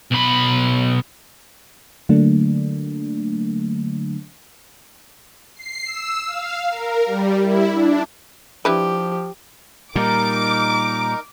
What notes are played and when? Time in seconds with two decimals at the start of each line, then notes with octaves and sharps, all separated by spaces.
0.11 B1 B5
2.09 D3 F#3 A3 A#3 D4
5.55 C7
5.86 E6
6.27 F5
6.69 A#4
7.06 G3
7.42 E4
7.73 D4
8.65 F3 D4 E4 G4 B4
9.95 A#2 G3 D#4 A#4 D6